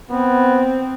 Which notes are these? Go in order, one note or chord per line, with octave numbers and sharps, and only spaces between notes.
B3 C4